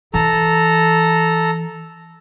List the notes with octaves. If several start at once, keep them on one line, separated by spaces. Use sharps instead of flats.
E3 A4 A#5